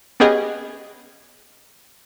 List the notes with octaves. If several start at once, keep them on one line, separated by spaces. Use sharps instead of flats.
B3 C#4 G4 G#4 D#5